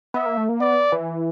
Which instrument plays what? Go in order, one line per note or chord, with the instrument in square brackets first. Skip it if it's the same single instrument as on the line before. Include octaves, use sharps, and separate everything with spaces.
[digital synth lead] B3 [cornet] E5
[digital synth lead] A#3
A3
A#3
[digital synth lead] B3 [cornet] D5
[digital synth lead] E3